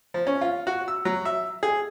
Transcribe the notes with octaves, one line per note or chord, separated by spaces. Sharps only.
F3
C#4
F4
F#4
E6
F#3
E5
G#4